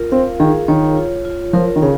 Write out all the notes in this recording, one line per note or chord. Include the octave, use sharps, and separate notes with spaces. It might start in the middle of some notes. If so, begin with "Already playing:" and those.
Already playing: F4 A#4
C4 F5
D#3 G#4
D#3 C#5
F4
F4
F3 A#4
D#3
C#3 F5